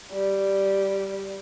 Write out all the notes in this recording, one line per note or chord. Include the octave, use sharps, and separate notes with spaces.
G3